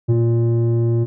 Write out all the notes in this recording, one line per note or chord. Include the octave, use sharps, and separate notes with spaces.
A#2